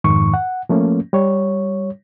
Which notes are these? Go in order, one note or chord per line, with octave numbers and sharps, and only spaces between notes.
F2 G#2 D#3 C#6
F#5
F3 A3 A#3 C#4
G3 C#5